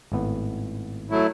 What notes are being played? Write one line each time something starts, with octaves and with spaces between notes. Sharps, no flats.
G#1 A2 B3
F#3 A3 E4